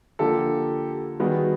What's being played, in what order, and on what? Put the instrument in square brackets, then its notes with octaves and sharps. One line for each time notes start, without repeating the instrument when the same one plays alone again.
[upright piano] D3 F3 A#3 [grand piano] G4 A4
[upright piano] D#3 G3 B3 [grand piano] F#4 G#4